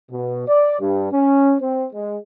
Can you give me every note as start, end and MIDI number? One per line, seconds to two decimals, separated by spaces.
0.11 0.46 47
0.48 0.76 74
0.80 1.09 43
1.12 1.55 61
1.61 1.87 60
1.94 2.17 56